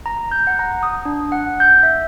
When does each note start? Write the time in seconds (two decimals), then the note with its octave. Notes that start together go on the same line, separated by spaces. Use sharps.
0.06 A#5
0.31 G6
0.47 F#5
0.59 A#5
0.83 D#6
1.05 D4
1.32 F#5
1.60 G6
1.83 E5